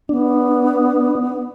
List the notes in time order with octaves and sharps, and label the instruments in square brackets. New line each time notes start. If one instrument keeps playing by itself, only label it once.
[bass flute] B3 [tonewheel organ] D4